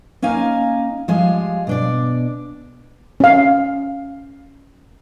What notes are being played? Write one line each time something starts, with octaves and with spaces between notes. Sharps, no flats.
A#3 C#4 D#4 F5 G#5
F3 G3 G#3 G#4 F5
B2 D4 D5
C#4 F5